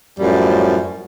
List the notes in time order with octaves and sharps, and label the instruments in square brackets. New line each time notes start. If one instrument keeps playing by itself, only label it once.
[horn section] F#2 A2 F3 G3